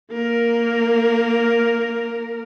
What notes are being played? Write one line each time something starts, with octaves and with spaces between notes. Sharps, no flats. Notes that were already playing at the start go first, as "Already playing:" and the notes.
A#3 A#4